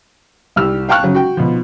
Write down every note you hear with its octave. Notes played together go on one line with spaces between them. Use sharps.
C2 G4 E6 F6
F5 G5 A5 C#6 F6 F#6
C#3 F#3 C#4
F#4 G5
B2 F3